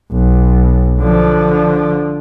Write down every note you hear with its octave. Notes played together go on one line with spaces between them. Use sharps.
B1
D3 F3